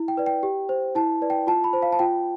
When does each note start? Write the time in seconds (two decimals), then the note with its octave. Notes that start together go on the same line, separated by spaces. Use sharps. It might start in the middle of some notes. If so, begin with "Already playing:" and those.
Already playing: E4
0.08 G5
0.17 B4 D5
0.26 G5
0.43 G4
0.69 C5
0.95 E4 A5
1.22 B4 D5
1.30 G5
1.47 F4 A5
1.64 B5
1.73 C5
1.82 F5
1.92 A5
1.99 F4 G5